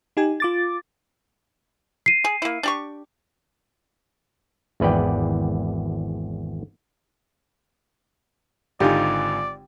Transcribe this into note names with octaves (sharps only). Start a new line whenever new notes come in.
D#4 G4 G#5
F4 D6 A6
C7 D#7
G#4
A#3 E4
D4 G4 C#6
G#1 E2 B4 D5 G5
G#1 D3 D#4 F4 G4 D5 G#5